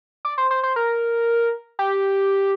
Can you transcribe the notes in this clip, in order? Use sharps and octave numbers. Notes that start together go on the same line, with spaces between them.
D5
C5
C5
C5
A#4
G4